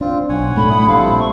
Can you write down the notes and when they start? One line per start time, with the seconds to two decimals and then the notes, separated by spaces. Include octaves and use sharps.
0.01 C4 D4 F4
0.29 B1 C#5 F#5 G#5
0.56 A2 A3 D4 B5
0.70 E4 F#5 D#6
0.88 A#1 G3 C4 E4 A4 F5
1.19 C#6